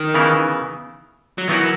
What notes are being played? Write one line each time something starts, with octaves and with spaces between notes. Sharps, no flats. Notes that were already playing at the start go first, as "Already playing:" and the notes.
Already playing: D#3
C#3 E3 B3 E4 A#4
F#3
E3 F#3 B3 D#4 F#4 A#4